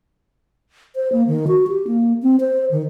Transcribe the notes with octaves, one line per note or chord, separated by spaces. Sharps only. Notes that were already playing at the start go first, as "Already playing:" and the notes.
C5
A#3
D#3
F#4
G4
A#3
C4
C5
D#3